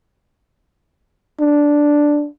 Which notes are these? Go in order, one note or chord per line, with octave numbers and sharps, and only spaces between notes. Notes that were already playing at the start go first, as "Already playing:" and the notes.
D4